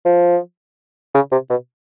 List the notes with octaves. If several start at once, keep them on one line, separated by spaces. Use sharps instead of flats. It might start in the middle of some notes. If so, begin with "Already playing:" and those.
F3
C#3
C3
B2